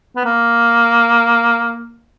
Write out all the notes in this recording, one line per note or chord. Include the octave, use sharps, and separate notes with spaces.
B3
A#3